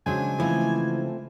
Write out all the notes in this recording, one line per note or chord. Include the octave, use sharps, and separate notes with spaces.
C#3 F#3 G#3 D4 C5 G#5
E3 F3 A3 C4